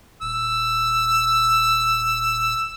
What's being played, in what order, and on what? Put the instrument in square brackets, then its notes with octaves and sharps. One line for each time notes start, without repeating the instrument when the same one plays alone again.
[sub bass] D#1 [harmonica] E6